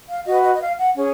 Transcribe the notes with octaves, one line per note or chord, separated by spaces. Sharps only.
F5
F#4 B4 D#5
D#5
D#5
F5
F#5
C#4 G#4 C#5